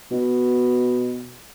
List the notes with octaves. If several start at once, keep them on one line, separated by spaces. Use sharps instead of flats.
B2